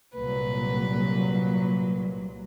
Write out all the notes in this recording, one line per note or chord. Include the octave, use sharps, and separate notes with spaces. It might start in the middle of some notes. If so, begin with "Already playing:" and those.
C2 A#2 F#3 B4